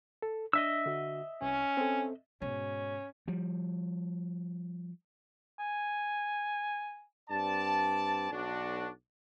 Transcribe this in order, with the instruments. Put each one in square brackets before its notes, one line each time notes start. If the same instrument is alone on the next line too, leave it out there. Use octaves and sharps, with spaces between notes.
[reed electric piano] A4
[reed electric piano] D4 [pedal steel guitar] D#5 E5 E6
[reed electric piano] D3 F#4
[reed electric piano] C2 [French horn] C#4
[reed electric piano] C4 A4
[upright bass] G#2 B2 [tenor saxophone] C#4
[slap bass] F3 G3
[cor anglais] G#5
[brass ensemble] G2 C4 D5 A5
B1 D4 F#4